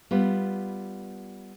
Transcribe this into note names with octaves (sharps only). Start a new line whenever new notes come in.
G3 B3 F4